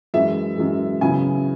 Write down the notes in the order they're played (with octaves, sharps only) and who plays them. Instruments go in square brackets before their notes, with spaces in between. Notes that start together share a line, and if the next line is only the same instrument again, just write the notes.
[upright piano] F#2 E3 G#3 E5
F#2 E3 G#3
C#3 F#3 B3 E4 G#5